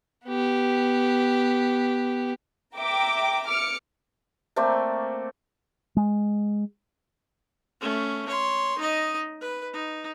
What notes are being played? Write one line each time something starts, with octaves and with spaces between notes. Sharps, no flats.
B3 G4
E5 G5 A#5 D6
D6 F6 C#7
A3 A#3 C4 D5
G#3
A3 C#4
C#5 C6
D#4 D#5
B4
D#4